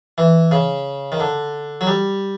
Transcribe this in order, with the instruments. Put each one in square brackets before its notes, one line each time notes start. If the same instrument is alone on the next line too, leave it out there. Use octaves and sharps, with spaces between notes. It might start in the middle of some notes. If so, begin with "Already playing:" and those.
[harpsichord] E3
C#3
D#3
D3
F#3
G3